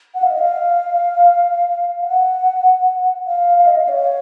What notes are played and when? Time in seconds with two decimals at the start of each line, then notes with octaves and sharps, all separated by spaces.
0.15 F#5
0.22 F5
0.30 D#5
0.39 F5
2.01 F#5
3.27 F5
3.57 F5
3.67 D#5
3.76 F5
3.89 C#5